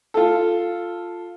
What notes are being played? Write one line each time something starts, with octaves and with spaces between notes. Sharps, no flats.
F4 A4